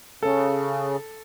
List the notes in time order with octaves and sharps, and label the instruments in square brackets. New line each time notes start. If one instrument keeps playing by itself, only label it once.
[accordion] C#3 [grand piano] A4